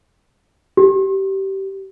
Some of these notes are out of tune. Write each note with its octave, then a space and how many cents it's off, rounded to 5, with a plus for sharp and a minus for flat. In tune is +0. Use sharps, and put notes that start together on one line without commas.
G4 -20